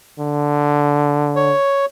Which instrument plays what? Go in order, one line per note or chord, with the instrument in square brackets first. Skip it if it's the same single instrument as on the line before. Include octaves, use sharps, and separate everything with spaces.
[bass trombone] D3
[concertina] C#5